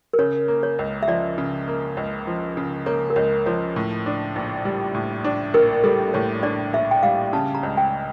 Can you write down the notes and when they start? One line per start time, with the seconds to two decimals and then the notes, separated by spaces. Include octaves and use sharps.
0.13 A#4
0.19 C#3 C#5
0.48 A#3
0.63 C#5
0.79 C#2
1.03 E5
1.08 F3 D5
1.38 C#3
1.68 A#3
1.97 C#2
2.27 F3
2.57 C#3
2.86 A#3 C#5
3.10 A#4
3.16 C#2 C#5
3.46 F3 C#5
3.76 A2
4.06 D4
4.36 A#1
4.65 G3
4.95 A2
5.24 D4
5.54 A#1 A#4
5.84 G3 A4
6.14 A2 C#5
6.43 D4 D5
6.73 A#1 E5
6.91 G5
7.03 G3 F5
7.33 C#3 A5
7.55 A#5
7.63 C#2
7.77 G5